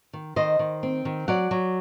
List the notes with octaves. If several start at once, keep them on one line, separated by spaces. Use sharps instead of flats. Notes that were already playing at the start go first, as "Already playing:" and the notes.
D#3
D#3 C5 D#5
D#3
C4
D#3
F#3 D5 F#5
F#3